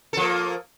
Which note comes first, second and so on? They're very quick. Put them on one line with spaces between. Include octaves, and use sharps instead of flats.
A4 F3 A#3